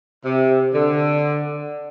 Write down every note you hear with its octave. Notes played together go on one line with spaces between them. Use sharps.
C3
D3